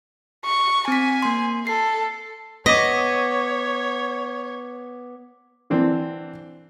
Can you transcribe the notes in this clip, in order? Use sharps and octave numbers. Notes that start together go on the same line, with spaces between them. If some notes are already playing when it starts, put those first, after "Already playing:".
C#6
C4 G#5 B6
A#3 C6
A4 C7
B3 C#5 D#5 D6 B6
D3 E3 C4 D4